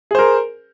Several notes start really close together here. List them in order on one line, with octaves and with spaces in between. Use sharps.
G#4 C5 A#4